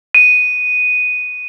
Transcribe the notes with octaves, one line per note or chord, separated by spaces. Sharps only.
D#7